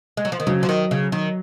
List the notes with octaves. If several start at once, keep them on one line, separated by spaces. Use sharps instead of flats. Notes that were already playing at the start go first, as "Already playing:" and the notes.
G#3
F#3
F3
D#3
C#3 F#3
F3
D#3
C#3
D#3